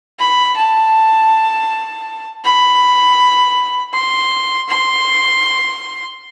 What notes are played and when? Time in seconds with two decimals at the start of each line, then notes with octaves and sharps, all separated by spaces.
0.20 B5
0.57 A5
2.44 B5
3.94 C6
4.69 C6